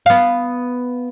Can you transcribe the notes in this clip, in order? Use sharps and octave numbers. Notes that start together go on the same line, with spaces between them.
B3 F5